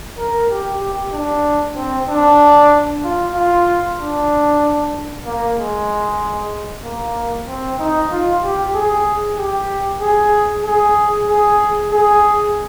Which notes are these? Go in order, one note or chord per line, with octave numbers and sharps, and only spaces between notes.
A#4
G4
G4
D4
C4
D4
F4
F4
D4
A#3
G#3
A#3
C4
D#4
F4
G4
G#4
G4
G#4
G#4
G#4
G#4